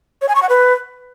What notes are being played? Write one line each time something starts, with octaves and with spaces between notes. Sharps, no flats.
C#5
G#5
C#6
F#5
B4